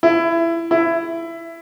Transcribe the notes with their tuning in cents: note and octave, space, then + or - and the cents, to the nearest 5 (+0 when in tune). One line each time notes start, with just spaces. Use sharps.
E4 +20
E4 +15